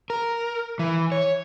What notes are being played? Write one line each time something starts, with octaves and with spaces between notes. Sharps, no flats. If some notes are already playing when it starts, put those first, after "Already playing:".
A#4
E3
C#5